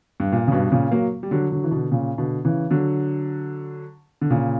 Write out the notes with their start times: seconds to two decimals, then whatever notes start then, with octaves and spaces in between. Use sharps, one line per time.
0.20 G2
0.32 A#2
0.48 C#3
0.52 G2 B2
0.72 A#2 C#3
0.91 F#3 A#3
1.23 G3
1.31 D3 F#3
1.52 D3 F#3
1.64 E3
1.71 B2 D3
1.91 A#2 C#3
2.18 B2 D3
2.45 C#3 E3
2.71 D3 F#3
4.21 D3
4.30 A#2 C#3